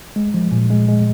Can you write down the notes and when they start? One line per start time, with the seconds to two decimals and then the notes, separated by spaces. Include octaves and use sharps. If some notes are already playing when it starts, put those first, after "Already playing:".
0.16 G#3
0.34 F3
0.51 A#2
0.70 G#3
0.89 G#3